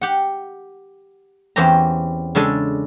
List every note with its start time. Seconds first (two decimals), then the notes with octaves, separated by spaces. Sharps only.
0.01 G4 F#5
1.56 E2 C4 C#4 G4 A#5
2.35 C#3 G#3 D4 A4 G#5